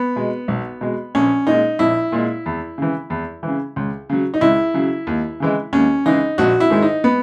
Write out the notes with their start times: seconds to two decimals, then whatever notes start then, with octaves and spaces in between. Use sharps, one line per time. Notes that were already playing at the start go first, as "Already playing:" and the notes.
Already playing: B3
0.16 B2 G#3
0.48 B1
0.81 B2 G#3
1.15 A#1 C#4
1.47 A#2 G#3 D#4
1.79 A#1 E4
2.12 A#2 G#3
2.46 E2
2.78 C#3 E3
3.10 E2
3.43 C#3 E3
3.76 C#2
4.10 C#3 F#3
4.34 D#4
4.41 C#2 E4
4.74 C#3 F#3
5.07 D#2
5.40 C#3 E3 G#3
5.73 D#2 C#4
6.05 C#3 E3 G#3 D#4
6.38 A#1 F#4
6.60 E4
6.70 G#2 D#3 G#3
6.82 D#4
7.04 B3